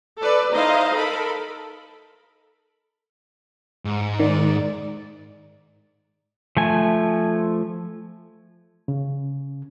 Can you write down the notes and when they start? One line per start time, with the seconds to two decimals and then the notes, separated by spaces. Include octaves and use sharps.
0.19 A4 B4 D5
0.52 D#4 E4 C5 D#5 F5
0.94 A4 A#4 B5
3.85 G#2
4.20 D#3 D5
6.57 F3 A3 G#5
8.88 C#3